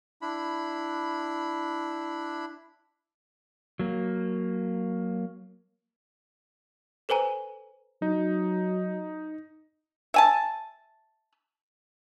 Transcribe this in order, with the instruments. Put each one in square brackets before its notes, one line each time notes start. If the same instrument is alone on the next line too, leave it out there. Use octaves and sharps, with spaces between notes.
[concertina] D4 E4 B5
[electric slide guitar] F#3 A#3
[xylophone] A4 B4 C5 G#5 A#5
[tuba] F#3 [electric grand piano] D#4
[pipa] E5 G#5 A5